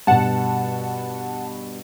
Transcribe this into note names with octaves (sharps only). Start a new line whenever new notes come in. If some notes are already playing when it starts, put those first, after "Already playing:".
G2 B2 F#5 A5